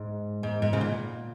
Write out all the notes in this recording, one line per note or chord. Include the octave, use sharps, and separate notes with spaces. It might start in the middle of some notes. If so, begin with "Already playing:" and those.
Already playing: G#2
G#2
G#2
C#3
A#2